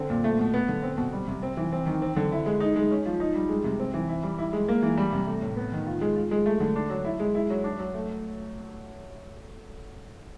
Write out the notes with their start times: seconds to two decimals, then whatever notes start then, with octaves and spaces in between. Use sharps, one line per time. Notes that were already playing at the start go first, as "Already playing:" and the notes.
Already playing: D3 C4
0.10 A#2
0.24 A3
0.39 B2
0.54 B3
0.68 D3
0.83 C4
0.97 B2
1.13 G3
1.28 C3
1.43 C4
1.57 E3
1.72 C4
1.86 D#3
2.02 C4
2.16 D3
2.32 E4
2.46 G#3
2.60 D#4
2.76 G#3
2.91 C#4
3.06 F3
3.20 D#4
3.35 G3
3.49 G#3
3.64 C3
3.79 C4
3.94 E3
4.09 E4
4.23 G3
4.38 E4
4.53 G#3
4.68 A#3
4.83 E3
4.97 G3
5.12 C3
5.27 A3
5.42 A2
5.56 B3
5.72 D#3
5.87 F4
6.01 G#3
6.16 F4
6.31 G#3
6.46 A3
6.60 D3
6.76 D4
6.90 F#3
7.05 E4
7.20 G#3
7.35 E4
7.50 F#3
7.64 D4
7.79 F#3
7.94 A3